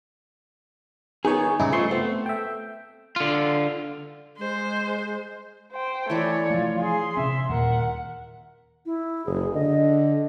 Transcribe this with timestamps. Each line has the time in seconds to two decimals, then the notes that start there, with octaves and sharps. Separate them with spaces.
1.25 D#3 B3 D#4 G#4 C#5
1.60 G2 C#3 D#4 E4 G#4
1.73 F3 A3 C6 C#6
1.91 A3 B3 C4
2.26 E5 G5
3.16 D3 F4
4.38 G#3 C5
5.73 C5 G5
6.10 E3 A3 B4 C#5 D5
6.50 F3 A3 F4
6.81 G#4 C6
7.17 C3 C4 C#4 E5
7.49 D#2 A#2 D#3 A#4 F#5
8.86 E4
9.26 F#1 G#4
9.55 D3 D#5